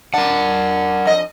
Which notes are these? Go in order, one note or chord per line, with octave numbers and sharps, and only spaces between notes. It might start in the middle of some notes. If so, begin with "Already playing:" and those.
D4 A#4 F#5
F2 D#5